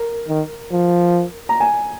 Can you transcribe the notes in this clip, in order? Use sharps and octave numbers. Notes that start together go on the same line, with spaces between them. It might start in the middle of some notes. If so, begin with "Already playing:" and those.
Already playing: A#4
D#3
F3
A#5
G#5